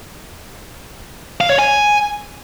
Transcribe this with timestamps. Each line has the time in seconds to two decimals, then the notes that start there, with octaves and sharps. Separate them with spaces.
1.41 F5
1.50 C#5
1.58 G#5